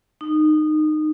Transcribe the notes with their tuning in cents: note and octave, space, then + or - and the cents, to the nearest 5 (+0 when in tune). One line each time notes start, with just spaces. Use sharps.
D#4 -20